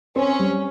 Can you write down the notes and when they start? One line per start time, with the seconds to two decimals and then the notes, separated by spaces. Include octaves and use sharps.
0.16 C4 C#4
0.39 G3